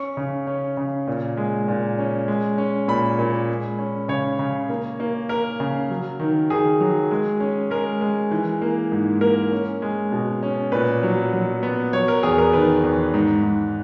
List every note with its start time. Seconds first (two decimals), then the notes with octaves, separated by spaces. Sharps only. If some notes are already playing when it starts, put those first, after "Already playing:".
Already playing: C#4 C#6
0.17 C#3
0.47 C#4
0.77 C#3
1.07 A#2
1.37 G#3
1.68 A#2
1.98 C#4
2.28 G#3
2.58 C#4
2.88 A#2 B5
3.19 A#2
3.49 G#3
3.79 C#4
4.08 C#3 C#5
4.39 C#3
4.69 A#3
5.00 A#3
5.29 A#3 A#4
5.60 C#3
5.90 F#3
6.20 D#3
6.50 D#3 G#4
6.80 F#3
7.11 G#3
7.40 C#4
7.70 G#3 A#4
8.01 G#3
8.31 E3
8.62 A#3
8.92 G#2
9.21 A#3 A#4
9.52 C#4
9.82 G#3
10.12 B2
10.43 C#4
10.72 A#2 B4
11.03 F#3
11.33 F#3
11.63 B3
11.93 F#3 C#5
12.08 A#4
12.23 E2 G#4
12.38 A#4
12.53 D#3 B4
12.84 E2
13.14 G#2
13.44 G#2